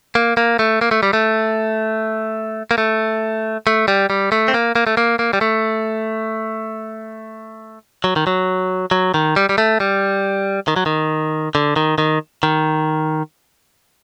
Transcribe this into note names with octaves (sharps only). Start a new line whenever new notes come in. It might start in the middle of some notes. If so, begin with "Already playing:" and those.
A#3
A#3
A3
A#3
A3
G3
A3
A#3
A3
A3
G3
G3
A3
C4
A#3
A#3
A3
A#3
A#3
G3
A3
F#3
D#3
F#3
F#3
D#3
G3
G3
A3
G3
D#3
F#3
D#3
D3
D#3
D#3
D#3